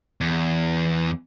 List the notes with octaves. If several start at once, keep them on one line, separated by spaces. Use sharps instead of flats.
E2